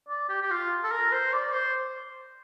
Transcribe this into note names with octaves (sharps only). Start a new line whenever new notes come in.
D5
G4
G4
F4
A4
A#4
C5
D5
C5